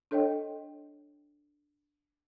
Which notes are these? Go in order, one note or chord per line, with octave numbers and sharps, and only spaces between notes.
D4 A4 C#5 D#5 G5